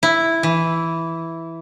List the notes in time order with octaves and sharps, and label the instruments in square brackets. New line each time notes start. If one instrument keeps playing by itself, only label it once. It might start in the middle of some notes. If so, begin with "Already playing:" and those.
[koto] E4
E3